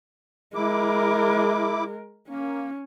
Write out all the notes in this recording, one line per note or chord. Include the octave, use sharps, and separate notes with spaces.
G#3 E4 A#4 D6
A#3 C#4